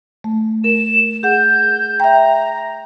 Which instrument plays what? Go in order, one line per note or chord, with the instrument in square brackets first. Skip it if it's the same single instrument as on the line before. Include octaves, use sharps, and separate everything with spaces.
[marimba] A3
[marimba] A#4 [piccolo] E7
[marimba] G#4 F#5 [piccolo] G6
[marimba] E5 G5 [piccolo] A#5